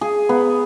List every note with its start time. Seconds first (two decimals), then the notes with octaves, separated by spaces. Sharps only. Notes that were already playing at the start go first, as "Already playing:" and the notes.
0.01 G#4
0.29 B3